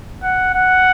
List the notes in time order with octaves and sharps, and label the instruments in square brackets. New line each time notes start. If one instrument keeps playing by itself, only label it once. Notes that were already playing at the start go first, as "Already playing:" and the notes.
[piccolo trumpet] F#5
F#5